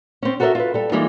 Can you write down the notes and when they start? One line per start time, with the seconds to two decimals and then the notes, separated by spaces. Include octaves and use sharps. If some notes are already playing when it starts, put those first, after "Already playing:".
0.22 C4 C#4
0.40 F#4 A4 A#4 C5 D#5 E5
0.55 F4 B4
0.74 G3 A4
0.92 E3 G3 G#3 A#3 D#4 F4